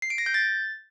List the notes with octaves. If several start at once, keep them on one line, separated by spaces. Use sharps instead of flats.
C7
D7
A#6
G6
A6